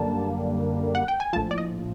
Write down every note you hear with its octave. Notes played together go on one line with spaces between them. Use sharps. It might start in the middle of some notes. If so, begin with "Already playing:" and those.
Already playing: F#2 D3 G3 A#3 D4 A5
F#5
G5
G#5
A#1 A2 F3 A5
D5
D#5